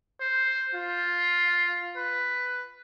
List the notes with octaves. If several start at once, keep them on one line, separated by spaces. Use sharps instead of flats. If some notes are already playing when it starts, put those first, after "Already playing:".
C5
F4
B4